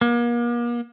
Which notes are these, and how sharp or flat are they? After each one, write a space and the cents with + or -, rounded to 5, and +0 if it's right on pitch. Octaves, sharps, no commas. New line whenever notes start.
A#3 +40